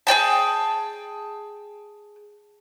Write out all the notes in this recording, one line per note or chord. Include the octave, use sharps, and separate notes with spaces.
G#4 D5 G5 A5